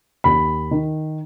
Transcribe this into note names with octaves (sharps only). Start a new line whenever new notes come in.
D#2 B5
D#3